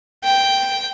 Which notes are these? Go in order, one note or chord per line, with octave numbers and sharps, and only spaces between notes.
G5